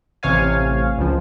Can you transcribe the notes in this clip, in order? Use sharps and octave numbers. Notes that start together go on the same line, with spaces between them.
A1 C3 C#5 F5 G#5
C#2 F3